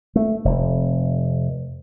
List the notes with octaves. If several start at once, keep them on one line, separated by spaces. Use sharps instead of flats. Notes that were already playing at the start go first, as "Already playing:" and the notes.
A3
F1